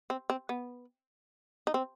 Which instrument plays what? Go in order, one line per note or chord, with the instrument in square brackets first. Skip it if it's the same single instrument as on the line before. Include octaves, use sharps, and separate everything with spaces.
[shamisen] C4
C4
B3
D#4
C4